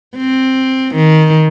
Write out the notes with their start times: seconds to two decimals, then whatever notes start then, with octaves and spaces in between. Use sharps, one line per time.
0.17 C4
0.95 D#3